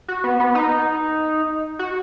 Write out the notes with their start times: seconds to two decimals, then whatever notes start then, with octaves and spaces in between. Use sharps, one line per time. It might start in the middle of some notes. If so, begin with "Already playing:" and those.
0.08 F#4
0.24 B3
0.40 B3
0.55 D#4
1.79 F#4